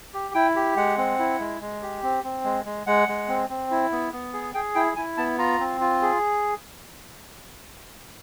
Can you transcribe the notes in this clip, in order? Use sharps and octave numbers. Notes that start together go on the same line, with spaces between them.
G4
E4 G5
G4
G#3 F#5
C4
E4
G#3
G#3
G4
C4
C4
G#3
G#3
G#3 F#5
G#3
C4
C4
E4
B3
B3
G#4
G#4 G5
E4 G5
E4 G#5
B3 A5
F4 A#5
C4
F4
G#4